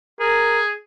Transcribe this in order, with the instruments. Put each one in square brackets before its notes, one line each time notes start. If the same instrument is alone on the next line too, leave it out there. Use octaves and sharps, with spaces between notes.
[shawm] G#4 [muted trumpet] A#4